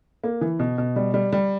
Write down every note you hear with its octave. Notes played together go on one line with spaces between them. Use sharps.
A#3
E3
B2
B2
G3
G3
G3